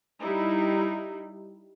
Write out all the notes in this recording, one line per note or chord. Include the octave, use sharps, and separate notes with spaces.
G3 D#4 E4